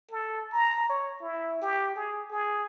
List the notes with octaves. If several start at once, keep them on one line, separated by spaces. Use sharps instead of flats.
A4
A#5
C#5
E4
G4
G#4
G#4